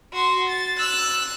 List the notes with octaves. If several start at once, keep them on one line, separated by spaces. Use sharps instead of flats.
F#4 C6
A6
E6 F#6